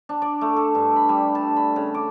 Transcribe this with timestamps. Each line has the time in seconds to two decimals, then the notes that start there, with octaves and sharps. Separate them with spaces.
0.09 D4
0.22 D5
0.41 A3
0.56 A4
0.75 G2
0.96 B5
1.09 G3
1.35 A5
1.56 B5
1.76 C#3
1.94 D6